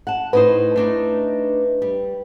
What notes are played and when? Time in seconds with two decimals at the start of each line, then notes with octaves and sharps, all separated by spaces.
0.07 F#5 A5
0.33 A2 D#4 B4 C5
0.76 A3 D4 D#4
1.82 G3